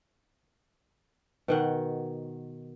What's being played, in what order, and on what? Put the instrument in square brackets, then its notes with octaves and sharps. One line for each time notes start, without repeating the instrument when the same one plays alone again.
[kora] B2 D#3 F#5